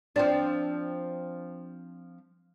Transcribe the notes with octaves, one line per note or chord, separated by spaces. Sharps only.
F3 C4 D4